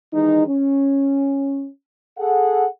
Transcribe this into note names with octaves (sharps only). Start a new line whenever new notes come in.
D#3 E3 G#3 D#4
C#4
G#4 A4 F#5